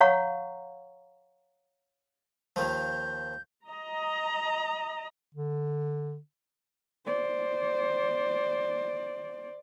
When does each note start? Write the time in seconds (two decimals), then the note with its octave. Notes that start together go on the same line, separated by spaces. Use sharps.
0.01 C#5 F5 F#5 A#5 C#6
2.56 D#2 D#3 F3 G6
3.65 D#5 A#5
5.35 D3
7.06 C5 D5